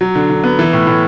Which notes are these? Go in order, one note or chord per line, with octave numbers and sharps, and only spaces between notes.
F#3
D3
D3
B3
E3
A2
A2